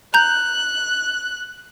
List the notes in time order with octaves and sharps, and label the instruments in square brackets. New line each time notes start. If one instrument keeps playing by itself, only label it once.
[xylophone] A#5 G6 [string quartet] F#6